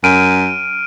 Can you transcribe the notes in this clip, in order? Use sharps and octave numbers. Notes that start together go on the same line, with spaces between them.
F#2 F6 D7 D#7